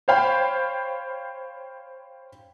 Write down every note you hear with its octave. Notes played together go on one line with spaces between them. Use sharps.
C5 C#5 F5 G5 B5